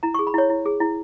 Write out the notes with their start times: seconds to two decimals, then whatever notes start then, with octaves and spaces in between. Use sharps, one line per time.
0.03 E4 A#5
0.14 C#6
0.19 G#4
0.27 B5
0.34 E4 C#5
0.50 E4
0.66 G#4
0.80 E4